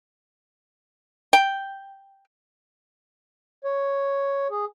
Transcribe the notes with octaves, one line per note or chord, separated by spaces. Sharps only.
G5
C#5
G#4